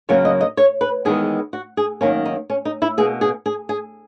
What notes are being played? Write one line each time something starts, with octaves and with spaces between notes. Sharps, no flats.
F#2 C#3 F#3 A#3 C#5
D#5
D#5
C#5
B4
E2 D#3 G#3 B3 G#4
F#4
G#4
F#2 D#3 A#3 C#4
D#4
C#4
D#4
E4
B2 A#3 G#4
G#4
G#4
G#4